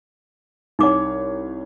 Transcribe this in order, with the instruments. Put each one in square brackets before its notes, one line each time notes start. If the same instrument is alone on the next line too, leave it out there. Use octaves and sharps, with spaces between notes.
[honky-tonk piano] C2 C#5 [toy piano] D#4 D6